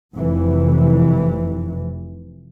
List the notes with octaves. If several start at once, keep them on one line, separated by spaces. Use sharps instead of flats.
F1 C3 E3